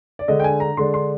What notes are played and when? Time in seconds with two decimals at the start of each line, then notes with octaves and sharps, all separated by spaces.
0.19 D5
0.28 D3 G#3 D4 D#5
0.40 G5
0.44 G#5
0.60 A#5
0.77 D3 G#3 D4 C6
0.94 C6